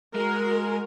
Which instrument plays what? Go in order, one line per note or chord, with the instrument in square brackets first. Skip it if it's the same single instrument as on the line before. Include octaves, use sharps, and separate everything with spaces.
[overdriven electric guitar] G#3 [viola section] F#4 A#4